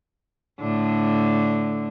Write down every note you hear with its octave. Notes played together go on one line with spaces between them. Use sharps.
A2 D3 D4